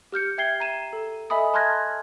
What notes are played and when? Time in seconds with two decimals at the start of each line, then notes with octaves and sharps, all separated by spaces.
0.12 G4 F6 G6 C#7
0.38 E5 G5 G#6 C7 G7
0.60 A#5 D#7 E7
0.93 A4
1.30 A4 D#5 E5 G#5 B5 D#6
1.54 A5 C6 F6 F#6 G#6 A#6